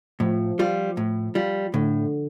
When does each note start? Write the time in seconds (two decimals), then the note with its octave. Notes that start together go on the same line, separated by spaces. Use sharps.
0.20 A2 F3
0.59 G3 F4
0.97 A2
1.35 G3 F4
1.74 A2 D3